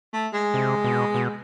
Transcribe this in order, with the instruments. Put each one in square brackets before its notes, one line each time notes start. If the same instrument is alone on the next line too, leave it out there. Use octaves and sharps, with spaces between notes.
[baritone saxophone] A3
G#3
[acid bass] C3
B2
B2